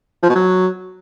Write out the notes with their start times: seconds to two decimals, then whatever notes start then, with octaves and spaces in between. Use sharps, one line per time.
0.23 F3
0.29 B2
0.35 F#3